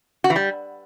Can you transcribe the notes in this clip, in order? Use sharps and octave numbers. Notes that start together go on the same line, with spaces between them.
F#4
E3
G3